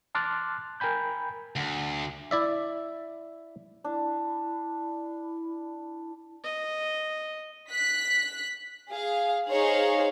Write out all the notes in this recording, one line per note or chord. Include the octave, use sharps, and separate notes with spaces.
A5 C6 D6 F6 F#6 A6
A#4 G5 G#5 B5 G6
D2
E4 D5 E5
D4 E4
D#5
F#6 B6
G#4 F5
D#4 G#4 C5 C#5 F5